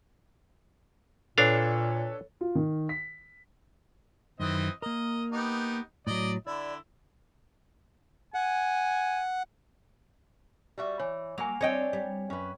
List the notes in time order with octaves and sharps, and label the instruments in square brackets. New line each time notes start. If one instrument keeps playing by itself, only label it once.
[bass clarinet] A#2 [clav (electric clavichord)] D4 F5 [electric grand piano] A4 B4 C#5
[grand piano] F4
D#3
B6
[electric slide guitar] F#2 D#3 [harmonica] E3 C4 D#5
[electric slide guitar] A#3 A#4 [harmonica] D#5
[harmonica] B3 D#4 G4
[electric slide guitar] A2 F#3 [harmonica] D5 D#5
[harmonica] D3 E4 [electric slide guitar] D5
[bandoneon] F#5 [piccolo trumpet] G#5
[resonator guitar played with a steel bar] G3 F#4 E5
[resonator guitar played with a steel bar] E3 [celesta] C#5
[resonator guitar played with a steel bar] F#3 [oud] A#3 [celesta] G#5 F7
[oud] C4 D#5 [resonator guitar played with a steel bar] D4 [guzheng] C#5 G5
[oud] G3
[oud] F#2 [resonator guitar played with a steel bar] C#4 B4